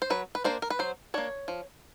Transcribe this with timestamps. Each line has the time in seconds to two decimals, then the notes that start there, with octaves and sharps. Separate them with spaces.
0.02 C5
0.10 F#3 B4
0.35 B4
0.44 A#3 D4 C5
0.62 A#4
0.70 B4
0.79 F#3 C5
1.14 A#3 D4 C#5
1.48 F3